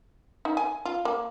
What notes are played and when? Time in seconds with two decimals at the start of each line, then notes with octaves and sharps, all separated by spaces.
0.45 D#4
0.57 G#5
0.85 F4
1.05 A#3